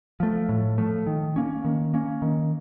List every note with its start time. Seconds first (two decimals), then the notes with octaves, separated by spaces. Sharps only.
0.20 F3 A3
0.49 A2
0.78 F3 A3
1.07 D#3
1.36 A#3 C#4
1.65 D#3
1.94 A#3 C#4
2.22 D#3